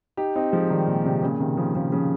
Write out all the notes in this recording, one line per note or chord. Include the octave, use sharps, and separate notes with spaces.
D#4 G4
C4 D#4
F3 G#3
D#3 G3
A#2
C3
A#2 C#3
C3 D#3
C#3 F3
C#3 F3
C#3 F3